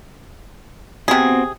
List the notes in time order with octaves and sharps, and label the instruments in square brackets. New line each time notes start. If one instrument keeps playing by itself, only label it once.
[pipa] C3 G#4 [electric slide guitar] B3 C4 F#4